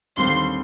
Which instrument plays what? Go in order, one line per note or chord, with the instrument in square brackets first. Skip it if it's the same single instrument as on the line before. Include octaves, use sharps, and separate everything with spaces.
[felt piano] D#2 D3 G3 C4 [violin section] C6